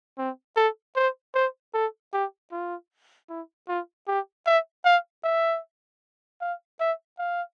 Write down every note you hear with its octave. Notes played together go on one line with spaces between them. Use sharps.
C4
A4
C5
C5
A4
G4
F4
E4
F4
G4
E5
F5
E5
F5
E5
F5